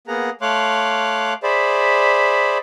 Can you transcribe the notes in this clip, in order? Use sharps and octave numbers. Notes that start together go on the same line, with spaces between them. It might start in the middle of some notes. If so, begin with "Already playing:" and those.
A#3 B3 G#4 F#5 A#5
A3 C#5 F5 C6 D6 F#6
G#4 C5 D5 E5 B5